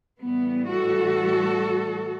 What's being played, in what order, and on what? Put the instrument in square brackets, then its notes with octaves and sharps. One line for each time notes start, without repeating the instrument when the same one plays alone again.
[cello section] A2 E3 G3 B3
F#4 A4